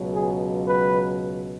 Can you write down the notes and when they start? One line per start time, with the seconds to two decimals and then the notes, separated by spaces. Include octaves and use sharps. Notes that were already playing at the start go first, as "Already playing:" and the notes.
Already playing: C#2 B2 F#3
0.14 G#4
0.68 B4